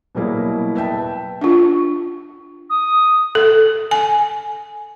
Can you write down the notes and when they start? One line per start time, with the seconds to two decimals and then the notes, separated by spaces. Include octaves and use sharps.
0.15 B2 F#3 G3 A#3 E4 G#4
0.75 B4 E5 G5 A5
1.41 D4 F4
2.70 D#6
3.35 A4
3.91 G#5